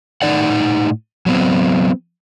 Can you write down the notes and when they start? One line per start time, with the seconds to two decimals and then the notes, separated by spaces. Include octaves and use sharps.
0.22 A2 D#4 D5 F#5
1.26 F#3 B3 C4